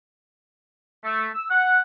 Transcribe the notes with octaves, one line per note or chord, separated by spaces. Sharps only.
A3
E6
F#5